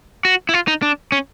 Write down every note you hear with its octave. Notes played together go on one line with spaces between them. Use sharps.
F#4
E4
F4
D#4
D4
C#4